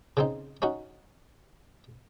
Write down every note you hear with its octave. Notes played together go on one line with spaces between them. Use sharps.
C#3 C4 D#4
C#4 D#4 F#4